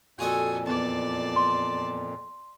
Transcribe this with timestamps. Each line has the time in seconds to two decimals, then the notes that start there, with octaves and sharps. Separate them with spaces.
0.19 F2 A#2 F4 F#4 A4 D#5 G#5
0.66 E2 D5 A5
1.36 C6